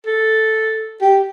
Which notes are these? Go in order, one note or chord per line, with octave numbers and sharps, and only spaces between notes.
A4
G4